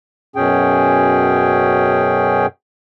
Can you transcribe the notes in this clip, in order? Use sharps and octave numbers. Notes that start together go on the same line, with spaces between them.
F#2 B2 C#4 G#4 G5